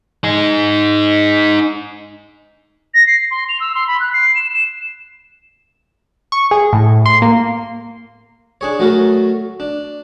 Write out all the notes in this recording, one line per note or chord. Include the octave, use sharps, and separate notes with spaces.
D#4 G#4
A#6
C7
C6
F7
E6
C6
B5
F#6
C7
E7
E7
C#6
G#4
A2
C6
A#3
D4 G#4 C#5
F#3 A3 F#4 A4 A#4
D4